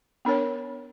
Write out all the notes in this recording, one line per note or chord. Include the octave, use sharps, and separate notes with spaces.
B3 D4 A#4 C#5